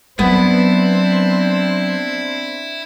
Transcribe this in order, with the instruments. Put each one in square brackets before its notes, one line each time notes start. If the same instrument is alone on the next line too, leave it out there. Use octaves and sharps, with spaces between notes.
[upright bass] F#3 [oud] B3 [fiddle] C4 D4 [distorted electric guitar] E4